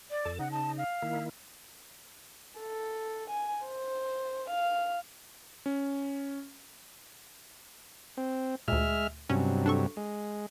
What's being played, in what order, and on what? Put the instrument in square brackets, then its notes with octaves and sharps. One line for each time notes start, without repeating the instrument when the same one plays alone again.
[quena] D5
[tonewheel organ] F2 A4 A5
[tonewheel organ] C#3 D#4 [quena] F#5
[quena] A5
F5
[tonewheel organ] D#3 A#3 E4
[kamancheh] A4
G#5
C5
F5
[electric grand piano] C#4
[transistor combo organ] C4
[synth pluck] D2 A#2 [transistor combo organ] G#3 E5 F6
[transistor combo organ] G2 C3 F#3 [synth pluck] C#4
[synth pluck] D4 A4 C#6
[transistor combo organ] G#3